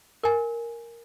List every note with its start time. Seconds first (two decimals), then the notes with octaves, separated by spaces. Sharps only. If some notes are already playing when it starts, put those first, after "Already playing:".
0.23 A#4 G#5